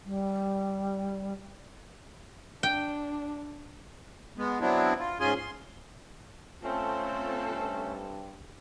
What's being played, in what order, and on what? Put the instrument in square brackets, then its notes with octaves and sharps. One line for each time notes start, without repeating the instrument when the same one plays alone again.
[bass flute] G3
[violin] D4 [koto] G5
[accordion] G#3 B3
F#3 B3 C4 D4 E4
F4
G#2 C#4 F4 G#4 G#5 C6
C6
[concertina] A3 C#4 [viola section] C4 A4 A5 [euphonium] F4
[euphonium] G2